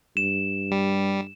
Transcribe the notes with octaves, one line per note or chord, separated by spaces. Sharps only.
G2 E7
G3